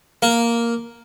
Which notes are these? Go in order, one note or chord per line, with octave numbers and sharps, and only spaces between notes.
A#3